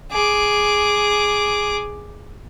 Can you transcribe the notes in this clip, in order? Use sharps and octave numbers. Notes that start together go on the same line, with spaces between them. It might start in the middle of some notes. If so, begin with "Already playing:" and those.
G#4 D6